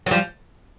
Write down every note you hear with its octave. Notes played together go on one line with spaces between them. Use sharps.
F#3
F3 G3